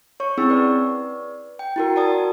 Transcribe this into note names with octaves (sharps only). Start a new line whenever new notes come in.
C#5 C#6
C4 C#4 E4 G#4 C#6 E6
B4 D5
G5
E4 F#4 A#4
F#4 A#4 D5 A5 D#6